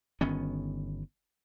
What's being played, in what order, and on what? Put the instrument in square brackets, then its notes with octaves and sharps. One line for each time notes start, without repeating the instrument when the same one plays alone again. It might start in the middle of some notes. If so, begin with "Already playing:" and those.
[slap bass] G1 D#3 B3 C#4